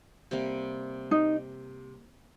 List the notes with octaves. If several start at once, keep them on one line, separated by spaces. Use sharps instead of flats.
C3 G3 A#3
D#4